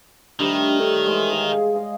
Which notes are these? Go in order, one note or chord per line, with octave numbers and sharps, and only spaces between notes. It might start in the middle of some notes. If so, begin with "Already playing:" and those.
D#3 G3 A3 D4 C5
A4 C#5
E3 G#3
G#4 D#5 F5
D#5 F5